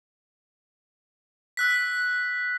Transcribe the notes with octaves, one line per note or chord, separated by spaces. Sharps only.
E6 F#6 B6